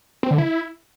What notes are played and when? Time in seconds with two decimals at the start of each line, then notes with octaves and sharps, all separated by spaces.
0.23 C4
0.31 D3
0.38 E4